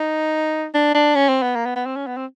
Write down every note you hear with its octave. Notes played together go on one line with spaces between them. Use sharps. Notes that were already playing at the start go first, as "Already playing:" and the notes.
Already playing: D#4
D4
D4
C#4
C4
B3
A#3
B3
B3
C4
C#4
B3
C4